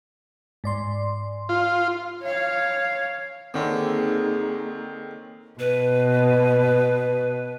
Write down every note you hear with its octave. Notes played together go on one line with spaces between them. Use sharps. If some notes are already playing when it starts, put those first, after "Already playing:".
G#2 D5 C6
F4
C#5 F5
D3 D#3 A#3 C4 C#4 D#4 G#4
B2 B4